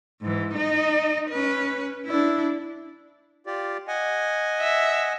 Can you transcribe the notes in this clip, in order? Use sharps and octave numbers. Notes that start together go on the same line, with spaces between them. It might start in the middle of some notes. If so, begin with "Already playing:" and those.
G#2 E3
D#4 D#5
C#4 B4
D4 E4
F4 G4 D5
D#5 F#5 G#5
E5